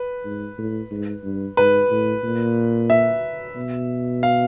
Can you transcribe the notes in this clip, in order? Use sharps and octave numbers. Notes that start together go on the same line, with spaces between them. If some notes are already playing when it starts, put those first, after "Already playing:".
Already playing: B4
G#2
A2
G#2
G2
G#2 B4
A2
A#2
E5
B2
F5